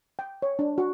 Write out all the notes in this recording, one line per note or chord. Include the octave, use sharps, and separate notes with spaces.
G5
C#5
D4
F#4